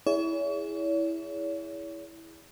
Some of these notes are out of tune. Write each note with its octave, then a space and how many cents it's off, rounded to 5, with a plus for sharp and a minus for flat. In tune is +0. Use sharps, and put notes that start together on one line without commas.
E4 -10 G#4 -10 C#5 +40